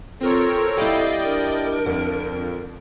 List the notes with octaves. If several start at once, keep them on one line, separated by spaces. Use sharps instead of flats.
C4 F4 A4 A#4 C#5
G3 E4 D5 D#5 F5 G5
D4 A#4
F2 D3